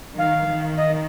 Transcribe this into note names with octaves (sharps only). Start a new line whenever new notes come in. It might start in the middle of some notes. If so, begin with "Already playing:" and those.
D#3 F5
D#3
D#5